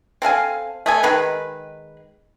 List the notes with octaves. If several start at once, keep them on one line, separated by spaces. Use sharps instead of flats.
C4 A4 F5 G#5
A3 D#5 G#5
D#3 G#3 B4